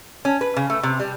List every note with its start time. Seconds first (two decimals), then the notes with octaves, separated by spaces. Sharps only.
0.25 C#4
0.41 B4
0.57 C#3
0.70 A3
0.83 C3
1.00 G3